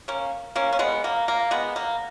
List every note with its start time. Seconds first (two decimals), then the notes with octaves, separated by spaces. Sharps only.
0.08 A#3 C#4
0.56 A#3 C#4
0.73 C#4
0.79 G#3 B3
1.04 A#3
1.28 A#3
1.51 G#3 B3
1.76 A#3